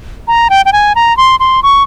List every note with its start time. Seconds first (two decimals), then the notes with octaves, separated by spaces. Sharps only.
0.28 A#5
0.50 G5
0.66 G5
0.73 G#5
0.95 A#5
1.17 C6
1.40 C6
1.63 C#6